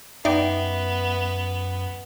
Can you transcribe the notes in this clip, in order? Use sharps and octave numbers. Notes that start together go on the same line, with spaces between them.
F#2 B3 D#4 D5 E5 G5